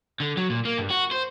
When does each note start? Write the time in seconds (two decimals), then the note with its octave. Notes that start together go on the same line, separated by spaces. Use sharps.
0.20 D3
0.37 F#3
0.50 A#2
0.65 A#3
0.78 G2
0.90 F#4
1.11 C5